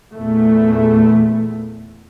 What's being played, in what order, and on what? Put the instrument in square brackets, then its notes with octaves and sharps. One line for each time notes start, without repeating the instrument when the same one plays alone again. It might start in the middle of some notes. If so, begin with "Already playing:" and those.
[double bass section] E2 A#2 A3